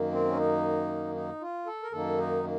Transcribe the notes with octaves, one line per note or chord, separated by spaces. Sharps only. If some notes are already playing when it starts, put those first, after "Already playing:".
Already playing: F#2 D#3 A#3
C4
C#4
D#4
D#4
F4
A4
A#4
F#2 D#3 A#3 A4
D#4
A#3